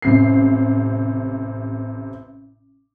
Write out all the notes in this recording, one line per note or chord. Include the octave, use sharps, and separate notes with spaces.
A1 C3 C7